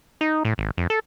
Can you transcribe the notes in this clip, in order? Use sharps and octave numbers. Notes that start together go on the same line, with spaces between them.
D#4
A2
G#1
F2
A4